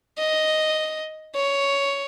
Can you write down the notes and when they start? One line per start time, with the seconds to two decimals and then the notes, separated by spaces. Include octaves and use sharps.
0.18 D#5
1.35 C#5